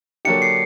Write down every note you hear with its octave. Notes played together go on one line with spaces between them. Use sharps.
D3 F#3 A#3 D4 G4 C#7
C7